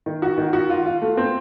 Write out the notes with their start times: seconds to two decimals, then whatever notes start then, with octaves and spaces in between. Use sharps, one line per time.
0.06 D#3
0.22 F#4
0.38 D#3
0.53 F#4
0.70 F4
0.86 F4
1.02 A3
1.17 C4